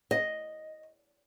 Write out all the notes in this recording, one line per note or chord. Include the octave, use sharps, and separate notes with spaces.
D#5